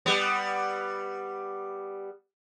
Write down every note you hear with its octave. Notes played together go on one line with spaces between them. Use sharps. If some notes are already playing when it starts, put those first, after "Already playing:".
G3 B3